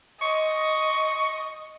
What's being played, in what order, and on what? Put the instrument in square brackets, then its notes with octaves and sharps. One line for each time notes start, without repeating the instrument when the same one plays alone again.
[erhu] D#5 [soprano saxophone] C#6